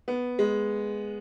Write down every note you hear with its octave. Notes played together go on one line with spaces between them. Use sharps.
B3
G#3